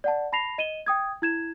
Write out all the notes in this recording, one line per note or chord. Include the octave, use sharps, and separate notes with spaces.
D5 F#5 A5
A5 B5 A#6 C7 F7
D#5 D#7 E7 G7
G5 D#6 G#6
E4 G#6 E7